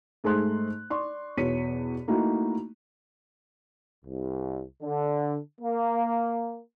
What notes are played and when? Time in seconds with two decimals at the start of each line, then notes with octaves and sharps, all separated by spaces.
0.24 G#2 A3 G#4 C5 C6 F#6
0.90 D5 C6 C#6
1.37 E2 B2 C#5 B6 C#7 D#7
2.08 A3 A#3 D#4 E4 F#4
4.05 C2
4.83 D3
5.61 A#3